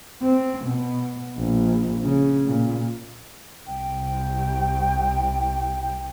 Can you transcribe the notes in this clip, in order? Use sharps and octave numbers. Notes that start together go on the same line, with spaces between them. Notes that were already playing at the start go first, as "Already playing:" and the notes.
C4
B2
A#1
C#3
A#2
C2 G5